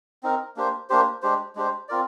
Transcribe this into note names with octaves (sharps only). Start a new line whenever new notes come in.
C4 D#4 A#4
A#3 D4 G4 C5
A#3 D4 G4 C5
G#3 D4 G4 C5
G#3 D4 G4 C5
C4 F4 A#4 D5